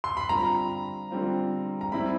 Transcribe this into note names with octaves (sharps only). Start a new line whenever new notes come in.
C6
B5
D3 G3 C4 F4 A#5
D3 G3 C4 F4
A#5
G3 C4 E4 B5